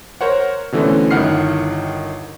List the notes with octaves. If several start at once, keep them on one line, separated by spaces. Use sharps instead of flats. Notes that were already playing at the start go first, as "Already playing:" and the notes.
A#4 C5 C#5 F#5
B2 D3 E3 A3 C4 C#4
G1 D#3 E4 F#5 F6 C7